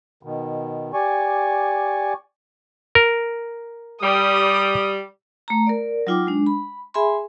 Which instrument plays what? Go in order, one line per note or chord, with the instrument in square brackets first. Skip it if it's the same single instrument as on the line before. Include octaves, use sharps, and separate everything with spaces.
[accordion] B2 D#3
G4 D5 G#5 C#6
[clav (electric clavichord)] A#4
[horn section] G3 [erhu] D#6
[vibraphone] A3 A#5
A#4 D5
F#3 D#4 F4 G5 D6
G#3 D4
B5
G#4 E5 G#5 B5 C6